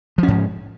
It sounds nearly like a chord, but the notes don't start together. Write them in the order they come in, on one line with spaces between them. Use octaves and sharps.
F3 C#4 G#2